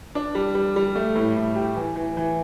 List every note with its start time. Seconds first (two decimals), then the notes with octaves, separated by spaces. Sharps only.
0.15 D4
0.35 G3
0.55 G3
0.76 G3
0.95 A3
1.16 A2
1.36 A2
1.56 G4
1.76 E3
1.96 E3
2.17 E3